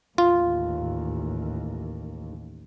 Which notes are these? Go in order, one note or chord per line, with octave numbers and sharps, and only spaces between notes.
A1 D#2 F4